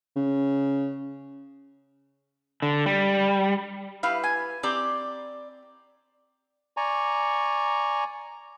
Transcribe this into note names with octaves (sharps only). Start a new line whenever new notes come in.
C#3
D3
G3
E4 G4 B4 F5
G#5
C4 G4 D5 A#5
D5 G#5 A#5 C#6